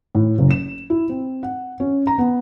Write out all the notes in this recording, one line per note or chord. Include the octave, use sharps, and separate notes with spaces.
A2
F#1
E7
E4
C4
F#5
C#4
A#5
B3